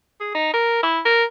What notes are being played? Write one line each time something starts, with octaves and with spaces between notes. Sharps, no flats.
G#4
D#4
A#4
E4
A#4